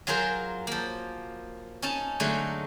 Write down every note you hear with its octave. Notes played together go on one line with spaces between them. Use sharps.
F#3 F4 G#4 A#4 C5
F3 A#3
C#4 D#4 A5
D3 F#3 G#3 A3 D#4